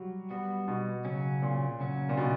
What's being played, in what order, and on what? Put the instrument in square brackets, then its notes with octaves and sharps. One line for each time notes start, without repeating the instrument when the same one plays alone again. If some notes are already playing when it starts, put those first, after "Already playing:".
Already playing: [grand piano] F#3 G3
[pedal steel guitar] G3 B3 F#4
[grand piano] B2
[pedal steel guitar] C#3 F#3 C#4
[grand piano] A#2
[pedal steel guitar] C#3 F#3 C#4
[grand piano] A#2
B2